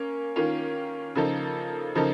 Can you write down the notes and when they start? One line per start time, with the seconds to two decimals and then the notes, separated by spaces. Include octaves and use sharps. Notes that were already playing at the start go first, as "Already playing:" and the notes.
Already playing: A#3 C#4
0.36 D#3 A#3 C#4 F4
1.15 C#3 F3 A#3 D#4 A4
1.95 C#3 F3 A#3 D#4 A4